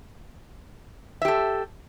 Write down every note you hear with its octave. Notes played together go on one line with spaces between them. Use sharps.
G4 A4 E5